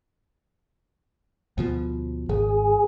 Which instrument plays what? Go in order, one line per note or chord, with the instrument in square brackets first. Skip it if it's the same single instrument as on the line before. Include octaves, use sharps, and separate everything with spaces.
[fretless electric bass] D2 B2 F3
[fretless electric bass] G#1 [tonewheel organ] G#4